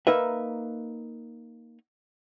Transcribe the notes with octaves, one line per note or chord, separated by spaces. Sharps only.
A#3 D#4 B4 E5